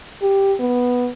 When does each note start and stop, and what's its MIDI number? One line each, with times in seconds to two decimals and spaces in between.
0.22 0.53 67
0.59 1.09 59